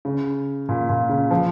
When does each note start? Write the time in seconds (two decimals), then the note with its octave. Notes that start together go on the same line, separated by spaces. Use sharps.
0.05 C#3
0.69 A#2
0.89 A#2
1.09 C#3
1.31 F3